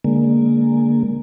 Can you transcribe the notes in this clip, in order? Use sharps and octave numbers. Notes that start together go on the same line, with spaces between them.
D3 G#3 A#3